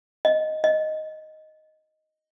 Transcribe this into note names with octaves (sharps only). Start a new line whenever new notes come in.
D#5
D#5